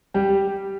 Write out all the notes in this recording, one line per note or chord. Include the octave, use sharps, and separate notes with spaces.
G3 G4